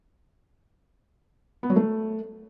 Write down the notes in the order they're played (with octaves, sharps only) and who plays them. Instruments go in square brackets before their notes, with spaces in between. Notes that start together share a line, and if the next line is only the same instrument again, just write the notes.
[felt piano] B3
F#3
A3